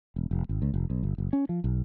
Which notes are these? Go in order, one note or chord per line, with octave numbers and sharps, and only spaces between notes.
E1
F1
G#1
C#2
F1
B1
G1
F#1
C#4
F3
B1